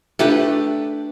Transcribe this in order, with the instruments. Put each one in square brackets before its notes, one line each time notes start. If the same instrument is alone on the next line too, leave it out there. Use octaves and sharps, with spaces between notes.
[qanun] A3 D4 G4 B4